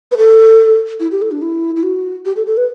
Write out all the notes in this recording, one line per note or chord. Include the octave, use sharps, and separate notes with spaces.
B4
A4
E4
G4
A4
D4
E4
E4
F#4
G4
A4
A4
B4